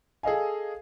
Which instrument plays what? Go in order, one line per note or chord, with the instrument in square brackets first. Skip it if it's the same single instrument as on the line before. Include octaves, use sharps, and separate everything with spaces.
[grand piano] G#4 A4 D#5 F5 G#5